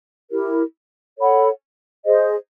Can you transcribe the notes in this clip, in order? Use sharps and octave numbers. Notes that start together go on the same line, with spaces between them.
E4 G4 A#4
A4 C#5 F#5 B5
G#4 C5 D#5